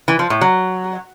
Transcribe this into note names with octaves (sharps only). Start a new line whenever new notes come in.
E3
F3
A2
F#3